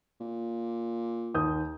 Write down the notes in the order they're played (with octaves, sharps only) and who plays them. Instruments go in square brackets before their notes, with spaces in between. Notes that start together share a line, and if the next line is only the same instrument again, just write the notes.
[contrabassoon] A#2
[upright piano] D#2 D#6 G6